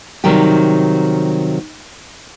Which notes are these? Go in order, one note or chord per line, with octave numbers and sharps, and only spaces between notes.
C3 D#3 F#3 G3 G4